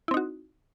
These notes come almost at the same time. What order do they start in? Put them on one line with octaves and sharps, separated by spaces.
E4 C4 D#4 F#4